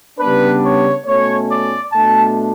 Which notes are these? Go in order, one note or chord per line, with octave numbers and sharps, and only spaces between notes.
C#3 G3 B3 D4 B4
C#5
B2 A3 C#4 C#5
D5
B2 A3 D4 A5